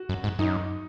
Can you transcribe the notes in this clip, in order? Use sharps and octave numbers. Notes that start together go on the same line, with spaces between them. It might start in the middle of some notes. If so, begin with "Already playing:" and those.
Already playing: F#4
F#2
G#2
F#2 D#4